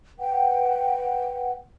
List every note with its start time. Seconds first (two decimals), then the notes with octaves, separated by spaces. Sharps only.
0.18 B4 F#5 G5